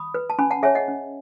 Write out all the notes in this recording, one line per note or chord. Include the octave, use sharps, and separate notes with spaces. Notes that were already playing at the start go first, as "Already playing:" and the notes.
Already playing: B5 D#6
B4
A5
C#4 G#5 B5
F#5 A5
G#4 C#5 E5 G#5
D#5 F#5
C#4